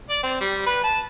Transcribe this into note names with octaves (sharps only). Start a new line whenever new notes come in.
D5
C4
G3
B4
A5